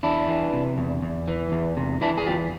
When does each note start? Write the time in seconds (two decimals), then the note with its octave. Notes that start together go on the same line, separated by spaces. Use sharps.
0.03 E2 D4 E4
0.28 E3
0.53 C3
0.78 E2
1.02 E2
1.28 E3
1.52 E2
1.77 C3
2.01 E3 D4 E4
2.17 G#4
2.27 E2 F4 G4